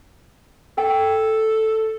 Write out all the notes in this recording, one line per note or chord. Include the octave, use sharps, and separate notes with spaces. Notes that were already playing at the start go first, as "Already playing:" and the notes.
A4 G5